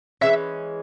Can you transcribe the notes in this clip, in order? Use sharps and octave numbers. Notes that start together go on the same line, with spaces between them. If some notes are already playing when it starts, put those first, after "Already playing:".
E3 G#3 C#4 E5